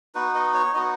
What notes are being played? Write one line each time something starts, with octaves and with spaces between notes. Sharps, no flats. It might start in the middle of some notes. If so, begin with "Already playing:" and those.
B3 D#4 F#4 B4
D#5
C#5
B3 D#4 F#4 D#5